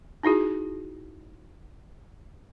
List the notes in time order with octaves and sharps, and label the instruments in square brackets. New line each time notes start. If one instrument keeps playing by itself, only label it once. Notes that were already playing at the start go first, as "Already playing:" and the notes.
[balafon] D#4 E4 F#4 G#4